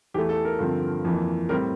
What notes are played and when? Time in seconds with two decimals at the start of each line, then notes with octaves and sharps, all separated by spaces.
0.14 E2 E3 A3 G4
0.29 A4
0.45 A#4
0.59 G2 D3 F3 C4
1.05 F2 E3 A#3
1.49 A2 G3 C4 A#4